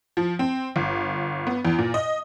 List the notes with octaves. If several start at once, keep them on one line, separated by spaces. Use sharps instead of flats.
F3
C4
G1
B3
E2
A#2
D#5